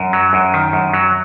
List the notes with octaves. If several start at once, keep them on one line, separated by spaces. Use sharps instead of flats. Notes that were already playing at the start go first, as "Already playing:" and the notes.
Already playing: F#2
F#3
F#2
D#3
F#2
F#3